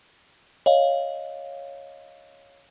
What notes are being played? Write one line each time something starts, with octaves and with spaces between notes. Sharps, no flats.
C#5 D#5 F5